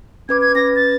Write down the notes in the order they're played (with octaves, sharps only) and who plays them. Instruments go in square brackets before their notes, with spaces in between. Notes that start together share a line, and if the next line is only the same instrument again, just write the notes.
[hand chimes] C#4 B4 D6 [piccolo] G#6
[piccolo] G#6
[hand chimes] C#4 B4 [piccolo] A#6
[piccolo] A6